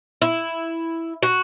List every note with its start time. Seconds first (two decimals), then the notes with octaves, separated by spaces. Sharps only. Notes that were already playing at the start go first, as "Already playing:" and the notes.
0.22 E4
1.23 F#4